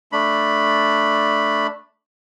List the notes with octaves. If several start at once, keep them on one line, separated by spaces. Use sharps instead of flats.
A3 D4 B5